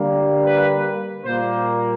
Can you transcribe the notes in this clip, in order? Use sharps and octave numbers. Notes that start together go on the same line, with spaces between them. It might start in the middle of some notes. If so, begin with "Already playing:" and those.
Already playing: D3 G3 A#3
B4
A#2 G3 A#3 C5